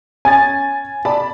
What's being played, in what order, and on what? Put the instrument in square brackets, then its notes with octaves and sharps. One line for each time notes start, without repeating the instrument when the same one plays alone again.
[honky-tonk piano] C#4 G#6 A6 [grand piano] G#5
[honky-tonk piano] D5 A5 B5